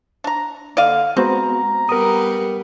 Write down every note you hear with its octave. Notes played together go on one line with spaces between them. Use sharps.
D4 A#5
D3 A#3 D5 D#5 F5
G#3 B3 C4 F#4 A#5
G3 B3 A#4 D#6